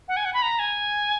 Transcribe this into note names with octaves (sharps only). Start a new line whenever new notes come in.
F#5
G#5
F#5
B5
A#5
G#5